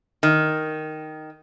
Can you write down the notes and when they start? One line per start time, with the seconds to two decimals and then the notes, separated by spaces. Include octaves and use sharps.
0.23 D#3